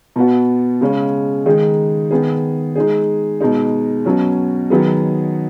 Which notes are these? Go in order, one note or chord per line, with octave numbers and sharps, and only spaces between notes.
B2 B3 F#4
C#3 G#3 C#4
D#3 G#3 D#4 G#4
D#3 B3 G#4
G#3 D#4 G#4
B2 G#3 D#4
B2 F#3 C#4
D#3 F#3 B3 G#4